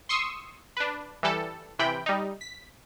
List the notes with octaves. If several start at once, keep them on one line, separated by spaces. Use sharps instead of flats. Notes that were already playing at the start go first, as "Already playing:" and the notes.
C6 C#6 D#6 E6 C7
D4 B4
E3 G3 A4
C3 E3 G5 B5
G3 D#4
B6